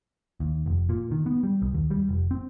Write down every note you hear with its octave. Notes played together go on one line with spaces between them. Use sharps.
D#2
F1
A#2
D#3
B3
G3
C2
D#2
G3
F1
C4